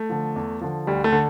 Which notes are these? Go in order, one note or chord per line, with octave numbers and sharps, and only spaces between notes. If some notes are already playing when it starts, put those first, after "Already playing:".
Already playing: A3
D3 F3
E2
D3 F3
D2 G3
A3
D3